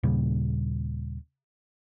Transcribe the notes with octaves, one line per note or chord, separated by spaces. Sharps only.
D#2 A#2 C#3 G3